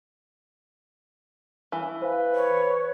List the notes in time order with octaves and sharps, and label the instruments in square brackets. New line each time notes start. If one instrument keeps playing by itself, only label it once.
[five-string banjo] E3
[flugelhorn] B4 [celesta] C5 F5
[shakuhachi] C#5